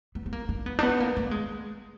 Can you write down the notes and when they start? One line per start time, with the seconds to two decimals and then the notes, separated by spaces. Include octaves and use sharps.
0.15 B3
0.26 B3
0.33 A#3
0.49 D4
0.66 B3
0.79 D4
0.83 B3
1.00 A#3
1.17 B3
1.31 G#3